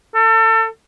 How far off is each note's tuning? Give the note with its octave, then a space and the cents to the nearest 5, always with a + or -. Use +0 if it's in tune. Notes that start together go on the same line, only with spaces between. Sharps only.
A4 +30